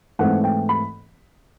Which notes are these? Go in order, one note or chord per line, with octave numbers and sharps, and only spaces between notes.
G#2 E3 A3 C4 F#5
G5
B5